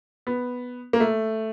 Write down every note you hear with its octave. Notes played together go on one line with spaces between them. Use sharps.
B3
A#3
A3